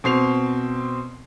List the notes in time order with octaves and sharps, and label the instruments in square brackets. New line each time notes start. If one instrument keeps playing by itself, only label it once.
[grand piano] B2 C4 C7 F7